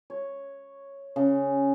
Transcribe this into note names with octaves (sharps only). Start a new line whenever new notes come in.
C#5
C#3